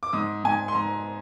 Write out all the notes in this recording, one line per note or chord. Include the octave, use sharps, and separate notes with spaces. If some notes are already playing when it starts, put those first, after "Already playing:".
D6
G#2 D#6
G#2 G#5
C6
G#2 A#5